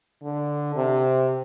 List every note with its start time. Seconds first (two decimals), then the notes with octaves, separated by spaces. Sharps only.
0.23 D3
0.76 C3